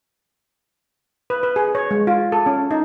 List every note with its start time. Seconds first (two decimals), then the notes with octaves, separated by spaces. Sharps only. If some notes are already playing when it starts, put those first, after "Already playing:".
1.30 B4
1.43 B4
1.56 G#4
1.75 C#5
1.91 G#3
2.07 F4
2.32 A4
2.46 C#4
2.71 D#4